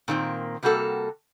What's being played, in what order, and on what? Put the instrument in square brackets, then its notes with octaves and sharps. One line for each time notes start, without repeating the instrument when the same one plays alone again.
[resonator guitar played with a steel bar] A#2 D#3 A#3 C4
C3 G3 A#3 F#4 A4